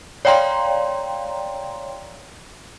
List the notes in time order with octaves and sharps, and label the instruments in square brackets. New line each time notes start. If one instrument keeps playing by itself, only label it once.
[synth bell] C#5 D5 F5 G5 A#5 C6